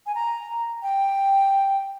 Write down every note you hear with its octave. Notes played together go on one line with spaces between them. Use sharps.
G#5
A#5
G5